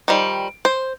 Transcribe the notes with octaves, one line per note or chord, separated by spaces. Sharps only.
D#3 F3 G3
C5